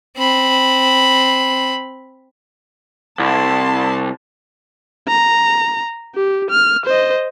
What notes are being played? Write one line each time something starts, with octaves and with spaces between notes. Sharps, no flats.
C4 B5
C2 A5 C6
A#5
G4
F6
C5 D#5